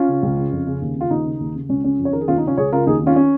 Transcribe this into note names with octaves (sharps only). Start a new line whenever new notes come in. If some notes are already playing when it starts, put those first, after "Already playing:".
Already playing: C#4 F4
C#3
C#2
C#3
F2
C#3
D#2
C#3 F4
D#2 D#4
C#3
D#2
C#3
C#2 C#4
C#3 C#4
F2
C#5
D#3 A#4
G#4
D#2 C#4 F4
D#4
C#3 C#4 F4
C#2 G#4 C#5
C#3 F4 A#4
D#2 D#4 G#4
D#3 C#4 F4
C#4